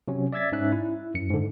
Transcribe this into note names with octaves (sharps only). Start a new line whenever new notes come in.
C3 F#3 C#4
D5 E5 E6 G#6 A6 B6
G#2 C#4 D#4 E5 F#6
E4
F#2 C#7
G#2 D3